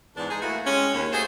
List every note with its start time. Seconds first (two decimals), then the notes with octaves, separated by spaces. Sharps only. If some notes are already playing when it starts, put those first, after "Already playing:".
0.16 E2 G#2 D4
0.30 G#3 D#4 G#4
0.42 A3 A#3 E4 F#4
0.65 G#3 C4 C#4
0.94 D#2
1.13 A3 F#4 G#4 C5